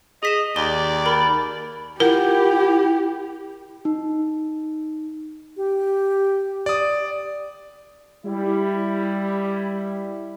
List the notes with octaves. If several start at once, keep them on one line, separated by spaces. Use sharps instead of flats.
G#4 D#5 B6 E7
D#2 D5 G7
A#4 B5
E4 F4 G4 A#4 F#5 G6
D#4
G4
D5 D#6
G3 E4